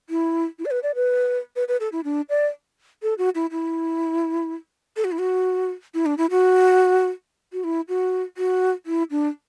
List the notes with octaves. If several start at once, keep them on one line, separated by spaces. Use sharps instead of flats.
E4
E4
D5
B4
D5
B4
B4
B4
A4
E4
D4
D5
A4
F#4
E4
E4
A4
F#4
E4
F#4
E4
D4
E4
F#4
F#4
E4
F#4
F#4
E4
D4